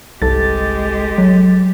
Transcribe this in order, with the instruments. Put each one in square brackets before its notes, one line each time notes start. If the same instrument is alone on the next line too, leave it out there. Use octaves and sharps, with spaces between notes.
[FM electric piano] G1 A4 A6 [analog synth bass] C2 [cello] G#3 G4
[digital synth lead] F#3